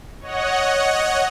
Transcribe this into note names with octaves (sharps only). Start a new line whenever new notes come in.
C#5 D#5 F#5